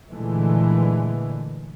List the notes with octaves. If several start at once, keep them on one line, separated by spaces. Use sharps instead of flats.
A#2 D3 E3 G#3 A3